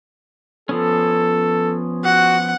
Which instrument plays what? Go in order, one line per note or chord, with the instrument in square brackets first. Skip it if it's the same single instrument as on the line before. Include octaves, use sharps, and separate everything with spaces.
[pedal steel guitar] F3 B3 C#4 [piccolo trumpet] A4
[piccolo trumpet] F#4 [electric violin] F#5